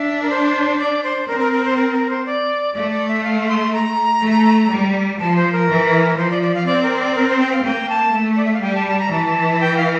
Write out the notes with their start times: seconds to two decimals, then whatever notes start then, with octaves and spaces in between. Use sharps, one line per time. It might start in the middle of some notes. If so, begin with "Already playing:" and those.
Already playing: D4 E5
0.22 A#4
0.30 C5
0.79 D5
1.04 C5
1.28 C4 A#4
1.40 A#4
1.52 A#4
1.65 C5
1.77 A#4
1.93 A#4
2.10 C5
2.26 D5
2.75 A3 D5
2.91 D5
3.08 E5
3.24 F5
3.48 C6
3.73 A#5
4.22 A3
4.71 G3
5.20 F3 A5
5.36 C5
5.52 A#4
5.69 E3
6.18 F3 C5
6.30 D5
6.42 D5
6.54 F5
6.66 C4 D5
6.83 A#4
6.99 D5
7.16 A#4
7.28 C5
7.40 G5
7.53 F5
7.64 A#3 G5
7.89 A5
8.14 A3
8.36 D5
8.45 E5
8.54 F5
8.62 G3 G5
8.75 A5
8.87 A5
8.99 A#5
9.11 E3 A5
9.61 G5
9.77 F5